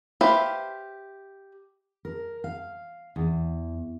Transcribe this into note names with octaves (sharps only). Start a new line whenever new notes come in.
G4 B4 C5 E5 F5
A#4
F5
E2